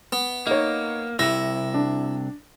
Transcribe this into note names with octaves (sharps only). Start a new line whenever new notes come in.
B3
A#3 D#4 C#5
C2 C3 E4 A#6
D4